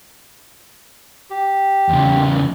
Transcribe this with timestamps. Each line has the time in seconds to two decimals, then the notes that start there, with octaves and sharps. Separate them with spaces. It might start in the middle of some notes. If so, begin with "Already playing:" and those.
1.30 G4
1.89 E2 C#3